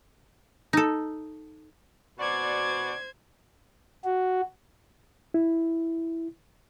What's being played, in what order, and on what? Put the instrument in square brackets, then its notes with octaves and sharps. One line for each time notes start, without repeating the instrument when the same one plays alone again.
[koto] D#4 A4
[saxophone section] B2 F#4 D5 [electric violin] C5 G#6
[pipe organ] F#4
[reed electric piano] E4